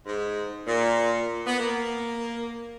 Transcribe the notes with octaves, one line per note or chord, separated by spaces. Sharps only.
G#2
A#2
B3
A#3